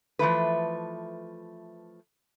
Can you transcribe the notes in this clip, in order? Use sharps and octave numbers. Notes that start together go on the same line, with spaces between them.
E3 F3 A3 B4